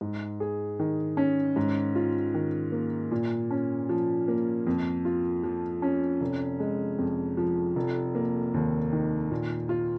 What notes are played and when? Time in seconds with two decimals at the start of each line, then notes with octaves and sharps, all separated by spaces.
0.01 G#2
0.40 G#4
0.79 D#3
1.17 C#4
1.56 G#2
1.95 F4
2.34 D#3
2.72 A#3
3.11 A#2
3.51 C#4
3.89 F3
4.28 A#3
4.67 F2
5.05 F4
5.44 F3
5.82 C#4
6.21 F1
6.60 G#3
6.98 F2
7.37 F3
7.76 F1
8.15 A#3
8.54 D#2
8.93 D#3
9.31 A#2
9.69 F4